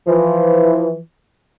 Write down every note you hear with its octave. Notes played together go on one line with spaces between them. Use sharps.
E3 F3